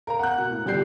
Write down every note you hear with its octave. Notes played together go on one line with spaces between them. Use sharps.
A#4 F5 A#5
F#5 F#6
B2
A2
G1 F3 G4 D5 G6 C7